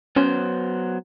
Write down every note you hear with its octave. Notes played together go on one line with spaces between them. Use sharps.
F#3 B3 C#4 C5